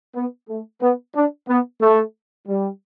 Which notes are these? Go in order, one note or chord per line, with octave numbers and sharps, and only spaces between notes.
B3
A3
B3
D4
B3
A3
G3